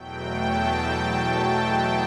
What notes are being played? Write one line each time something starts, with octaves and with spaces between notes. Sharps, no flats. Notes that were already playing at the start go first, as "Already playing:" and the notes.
Already playing: E2 B2 F#3 A3 G5
A5
A5